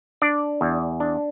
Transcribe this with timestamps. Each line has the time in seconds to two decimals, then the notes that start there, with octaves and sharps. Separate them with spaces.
0.22 D4 D5
0.61 E2
1.00 D4